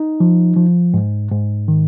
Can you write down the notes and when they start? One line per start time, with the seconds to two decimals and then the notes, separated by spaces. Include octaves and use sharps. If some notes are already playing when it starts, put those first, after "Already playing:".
Already playing: D#4
0.20 F3
0.56 F3
0.94 G#2
1.32 G#2
1.68 D#3